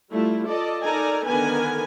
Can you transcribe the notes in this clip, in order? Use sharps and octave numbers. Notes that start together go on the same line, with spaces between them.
G3 A3 E4 F4
F4 A4 D5 D#5 A5
D#4 A4 A#4 D5 G#5 A#5
D3 D#3 B3 A#4 B4 G#5